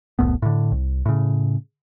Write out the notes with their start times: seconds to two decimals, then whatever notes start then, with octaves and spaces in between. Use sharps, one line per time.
0.19 E1 C2 A2 B3
0.42 A2 D3
0.72 C2
1.06 A2 C#3